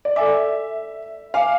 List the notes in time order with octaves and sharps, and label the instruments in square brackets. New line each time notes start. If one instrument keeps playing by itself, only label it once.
[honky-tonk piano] D5
[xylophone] A4 D5 G#5 D6 [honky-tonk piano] E5
[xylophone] E5 G#5 D6 F6 [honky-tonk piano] F5